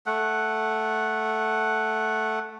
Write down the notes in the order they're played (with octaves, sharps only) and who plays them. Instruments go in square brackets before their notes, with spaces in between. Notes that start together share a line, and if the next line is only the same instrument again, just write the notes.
[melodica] A3 F#5